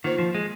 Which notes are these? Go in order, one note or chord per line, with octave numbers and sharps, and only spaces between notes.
D#3 A#3 F4 C5
F3
G#3